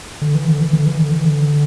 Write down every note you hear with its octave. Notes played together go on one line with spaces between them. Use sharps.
D3
E3
D3
E3
D3
E3
D3
E3
D3